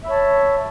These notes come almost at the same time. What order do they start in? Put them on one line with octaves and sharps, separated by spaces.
E5 B5 C#5 A5